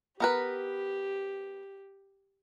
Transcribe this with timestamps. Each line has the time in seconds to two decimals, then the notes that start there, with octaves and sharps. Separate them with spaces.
0.20 B3 G4 A#4 B4